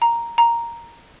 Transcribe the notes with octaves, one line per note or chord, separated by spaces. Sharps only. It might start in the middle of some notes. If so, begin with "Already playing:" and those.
A#5
A#5